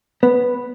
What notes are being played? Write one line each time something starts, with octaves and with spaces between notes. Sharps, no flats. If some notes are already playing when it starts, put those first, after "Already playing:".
B3